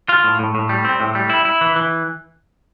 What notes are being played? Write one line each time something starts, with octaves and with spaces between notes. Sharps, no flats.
F4
A2
A2
A2
G3
C4
A2
G3
E4
E4
E3
E3